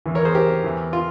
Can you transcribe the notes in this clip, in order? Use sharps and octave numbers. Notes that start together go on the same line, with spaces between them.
E2 E3
A#4 C#5
G#4 C5
G4 A#4
E2 E3
F4